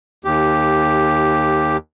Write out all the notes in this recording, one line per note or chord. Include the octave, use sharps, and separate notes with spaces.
D#2 G4